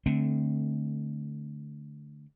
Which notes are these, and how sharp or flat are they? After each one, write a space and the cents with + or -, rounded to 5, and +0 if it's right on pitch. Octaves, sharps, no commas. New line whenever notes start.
D3 +0 A3 -10 C4 +0